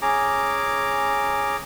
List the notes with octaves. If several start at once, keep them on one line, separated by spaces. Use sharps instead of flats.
C#4 G#4 A#5 D6